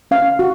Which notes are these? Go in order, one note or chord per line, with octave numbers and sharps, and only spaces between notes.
C#4 F5
F#4